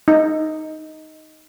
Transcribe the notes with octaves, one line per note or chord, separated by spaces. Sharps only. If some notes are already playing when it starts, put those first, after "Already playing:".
D#4